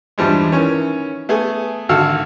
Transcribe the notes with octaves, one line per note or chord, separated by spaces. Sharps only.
E2 G2 F3 G3 G#3
D#3 E3 C#4 C#5
A3 B3 G#4
G#1 D2 F#4 A4 F5 E6